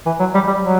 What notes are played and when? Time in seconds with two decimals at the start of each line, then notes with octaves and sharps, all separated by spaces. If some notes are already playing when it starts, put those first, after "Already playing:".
0.06 E3
0.20 F#3
0.34 G3
0.47 G3
0.61 F#3